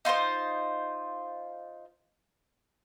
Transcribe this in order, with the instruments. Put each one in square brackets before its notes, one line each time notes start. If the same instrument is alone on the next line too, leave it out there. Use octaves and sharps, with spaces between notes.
[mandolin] D#4 F4 B4 C5